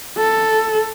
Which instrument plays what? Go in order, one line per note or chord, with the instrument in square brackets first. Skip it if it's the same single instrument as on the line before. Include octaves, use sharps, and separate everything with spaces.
[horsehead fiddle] A4